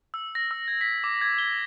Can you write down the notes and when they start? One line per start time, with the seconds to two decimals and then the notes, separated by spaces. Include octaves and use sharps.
0.14 E6
0.35 A#6
0.51 E6
0.68 G#6
0.81 B6
1.04 D6
1.21 G#6
1.38 G7